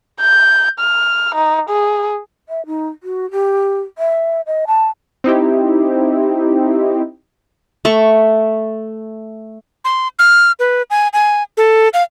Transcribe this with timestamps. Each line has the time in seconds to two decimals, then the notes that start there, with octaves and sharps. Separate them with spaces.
0.21 G6
0.80 F6
1.35 D#4
1.69 G#4
2.49 E5
2.66 D#4
3.03 F#4
3.31 G4
3.98 E5
4.47 D#5
4.67 A5
5.24 C4 D#4 E4 G4
7.85 A3 C#6
9.85 C6
10.19 F6
10.59 B4
10.90 G#5
11.13 G#5
11.57 A4
11.94 F5